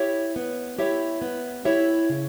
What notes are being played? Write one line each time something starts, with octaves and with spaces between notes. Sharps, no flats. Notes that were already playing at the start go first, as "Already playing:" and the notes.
Already playing: E4 G4 C#5 E5
B3
E4 G4 C#5 E5
B3
E4 G4 C#5 E5
C#3